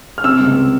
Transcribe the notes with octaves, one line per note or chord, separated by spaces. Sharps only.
F6
C3 E6
C#2